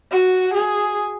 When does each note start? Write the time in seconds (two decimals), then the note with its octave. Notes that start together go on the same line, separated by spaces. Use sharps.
0.11 F#4
0.54 G#4